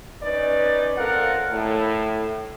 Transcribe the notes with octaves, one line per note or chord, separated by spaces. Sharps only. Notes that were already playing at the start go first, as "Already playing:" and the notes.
C#4 D#4 B4 D5
C4 F4 A4 A#4 F5 F#5
A2